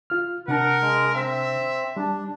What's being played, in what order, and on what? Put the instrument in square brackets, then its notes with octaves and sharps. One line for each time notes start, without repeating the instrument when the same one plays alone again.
[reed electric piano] F4 F6
[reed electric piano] C3 D4 A5 [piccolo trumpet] A#4 [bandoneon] F#5
[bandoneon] G#3
[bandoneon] C4 [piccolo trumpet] E5
[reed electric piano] G3 A5 [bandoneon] D4